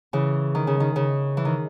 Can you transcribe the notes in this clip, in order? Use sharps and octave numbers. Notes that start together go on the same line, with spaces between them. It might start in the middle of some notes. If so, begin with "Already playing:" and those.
C#3 E3
D#3
C#3
D#3
C#3
E3
D#3